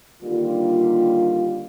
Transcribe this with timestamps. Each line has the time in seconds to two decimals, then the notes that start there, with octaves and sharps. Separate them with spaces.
0.22 D3 D#3 G3 A#3 F4